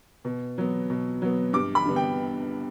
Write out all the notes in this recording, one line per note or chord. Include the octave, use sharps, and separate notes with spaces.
B2
F#3 B3
B2
F#3 B3
G2 D6
B5
D3 G3 B3
G5